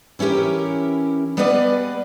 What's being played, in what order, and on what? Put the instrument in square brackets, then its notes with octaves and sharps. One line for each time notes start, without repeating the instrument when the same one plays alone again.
[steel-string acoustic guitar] E3 C#4 E4 G4 A#4
G3 B3 G#4 B4 D5 D#5